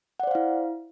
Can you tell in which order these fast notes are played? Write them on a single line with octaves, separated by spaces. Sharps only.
F#5 D5 C5 F5 E4